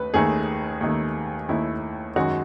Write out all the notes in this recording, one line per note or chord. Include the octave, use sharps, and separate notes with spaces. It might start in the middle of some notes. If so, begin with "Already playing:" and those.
Already playing: D#2 D#3 A3 B4
D#2 D#3 A3 G#4
D#2 D#3 A3
D#2 D#3 A3 E4
F#2 D#3 G#3 F#4